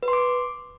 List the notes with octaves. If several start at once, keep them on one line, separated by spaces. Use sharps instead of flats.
B4
C6
D6